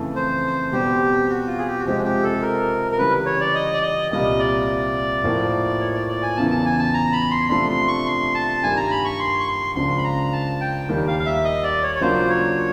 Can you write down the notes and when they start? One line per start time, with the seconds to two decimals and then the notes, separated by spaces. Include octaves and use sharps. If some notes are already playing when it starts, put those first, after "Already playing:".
Already playing: F2 C#3 E3 A3
0.16 C5
0.72 B2 G3 C4 G4
1.29 F#4
1.47 F4
1.58 G#4
1.67 G4
1.79 F#4
1.86 F2 C3 F3 G#3 C4 G4
2.04 G4
2.23 A4
2.42 A#4
2.92 A#4
2.98 C#3 E3 G3 B4
3.26 C#5
3.40 D5
3.55 D#5
3.73 D5
3.83 D#5
4.11 C2 A#2 G3 A#3 D#5
4.39 D5
5.24 A2 F3 A#3
5.80 C#5
5.94 D5
6.08 D5
6.22 G#5
6.37 E2 C#3 E3 A5
6.51 A5
6.65 G#5
6.79 A5
6.94 A#5
7.13 B5
7.31 C6
7.49 C3 F3 A3 D4 C6
7.69 C6
7.88 C#6
8.06 C6
8.35 A5
8.62 G2 D#3 G3 A#3 G#5
8.77 A#5
8.91 B5
9.05 C#6
9.20 C6
9.40 C#6
9.48 C6
9.75 C#2 C#3 F3 A#3 D4 C6
9.98 B5
10.04 A#5
10.32 A5
10.61 G5
10.89 D#2 D#3 G3 A#3
11.07 F5
11.19 F5
11.26 E5
11.45 D#5
11.63 D5
11.83 C#5
11.95 C#5
12.01 C#3 F#3 A#3 D4 F4 C5
12.29 C#5